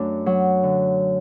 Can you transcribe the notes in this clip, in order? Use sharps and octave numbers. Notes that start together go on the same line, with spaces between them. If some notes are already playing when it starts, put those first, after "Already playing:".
Already playing: F#2 A3 D4
F#3
D3